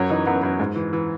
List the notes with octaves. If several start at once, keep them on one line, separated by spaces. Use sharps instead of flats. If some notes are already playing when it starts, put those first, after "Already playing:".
Already playing: F#2 F#3 C#5
E3 D#4
F#2 B3
F#2
G#2
E3
E3